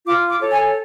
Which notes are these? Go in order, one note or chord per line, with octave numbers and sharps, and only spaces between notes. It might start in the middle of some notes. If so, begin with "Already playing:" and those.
F4 D6
D6
A4 C#5
G#5